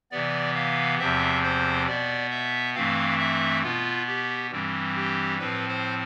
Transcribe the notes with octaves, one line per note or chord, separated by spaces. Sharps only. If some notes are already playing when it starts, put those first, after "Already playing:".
C3 E3 B3 D5
F5
E2 C3 F3 C4 E5
C5
B2 B3 D5
E5
G2 E3 A3 C4 F5
E5
B2 B3 F4
G4
G2 E3 G3 C4
G4
A2 F3 C4 B4
C5